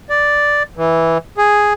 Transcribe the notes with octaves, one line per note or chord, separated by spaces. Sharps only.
D5
E3
G#4